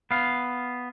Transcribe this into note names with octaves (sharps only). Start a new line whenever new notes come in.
B3 F5